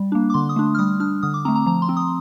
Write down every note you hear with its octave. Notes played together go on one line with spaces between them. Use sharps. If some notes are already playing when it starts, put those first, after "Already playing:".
Already playing: G3
A#3 D4
D6
D3 C6
D#6
A3 D4
F6
G3 D#6
D4 F6
D3 D#6
D6
A3 C4 A#5
A#5
F3 A#5
C6
C4
D#6